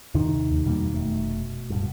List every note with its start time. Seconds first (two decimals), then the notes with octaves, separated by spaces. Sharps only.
0.14 D#2 C3 D#3
0.51 D#2
0.65 E2 B2 G3 A#3
0.94 F1 A3
1.70 D1 G2